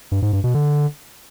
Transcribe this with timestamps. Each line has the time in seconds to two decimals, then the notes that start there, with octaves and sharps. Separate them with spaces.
0.12 G2
0.22 G#2
0.33 G2
0.44 B2
0.54 D3